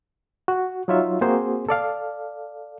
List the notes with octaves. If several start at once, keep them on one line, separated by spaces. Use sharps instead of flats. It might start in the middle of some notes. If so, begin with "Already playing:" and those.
F#4
F#3 D#4 F4 C#5 E5
A#3 C4 F#4 G#4 C5
A4 D5 F5